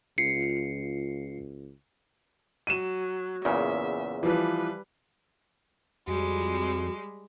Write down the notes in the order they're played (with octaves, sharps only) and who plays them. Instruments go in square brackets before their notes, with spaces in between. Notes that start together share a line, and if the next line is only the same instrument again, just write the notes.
[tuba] C#2 [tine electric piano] F4 C7 C#7
[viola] F#3 [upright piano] D#7 E7
[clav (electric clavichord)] E2 A#2 C#3 [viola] E5
[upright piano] E3 F3 [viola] G3 B4
[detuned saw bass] F2 [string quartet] G3 G#3 [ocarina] F#4